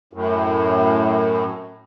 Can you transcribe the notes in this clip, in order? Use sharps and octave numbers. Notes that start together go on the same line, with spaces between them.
F#2 A2